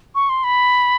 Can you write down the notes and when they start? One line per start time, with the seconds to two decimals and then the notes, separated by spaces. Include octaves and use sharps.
0.15 C#6
0.29 C6
0.44 B5